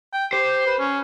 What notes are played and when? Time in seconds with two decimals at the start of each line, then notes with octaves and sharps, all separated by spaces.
0.13 G5
0.33 G4 C5
0.66 B4
0.79 C#4